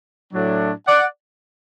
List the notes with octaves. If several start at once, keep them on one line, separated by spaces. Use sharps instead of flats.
A2 F#3 D4
D5 F#5